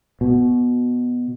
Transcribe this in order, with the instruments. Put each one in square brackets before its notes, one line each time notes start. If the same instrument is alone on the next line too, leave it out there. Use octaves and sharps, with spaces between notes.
[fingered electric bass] B2